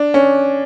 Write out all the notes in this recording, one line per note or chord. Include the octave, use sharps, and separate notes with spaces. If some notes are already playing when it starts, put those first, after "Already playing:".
Already playing: D4
C#4